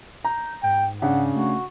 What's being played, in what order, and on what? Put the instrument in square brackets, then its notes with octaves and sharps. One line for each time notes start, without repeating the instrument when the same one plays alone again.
[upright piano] A#5 [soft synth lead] G6
[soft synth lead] G#2 [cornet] G5
[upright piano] C#3 D4 [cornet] F#5
[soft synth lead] A3 [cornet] F#4